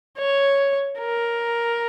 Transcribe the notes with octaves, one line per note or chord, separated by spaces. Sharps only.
C#5
A#4